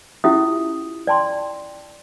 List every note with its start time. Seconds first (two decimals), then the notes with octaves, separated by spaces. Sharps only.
0.24 C#4 E4 F4 G4 E5 D#6
1.07 D5 G5 A5 C6